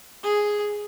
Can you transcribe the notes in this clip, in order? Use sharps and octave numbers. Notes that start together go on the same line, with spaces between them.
G#4